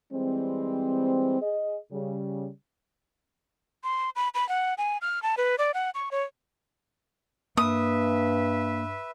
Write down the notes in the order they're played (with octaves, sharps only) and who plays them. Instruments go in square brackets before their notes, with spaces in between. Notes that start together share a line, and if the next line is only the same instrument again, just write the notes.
[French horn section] E3 G3 G#3 C4
G#4 D#5
C#3 G3
[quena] C6
B5
B5
F#5
G#5
F6
A5
B4
D5
F#5
C#6
C#5
[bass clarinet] G2 [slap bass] A#3 [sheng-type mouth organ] B4 E5 [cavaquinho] D#6